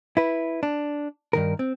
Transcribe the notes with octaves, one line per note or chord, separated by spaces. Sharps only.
E4 B4
D4
G2 D#3 A#4
C4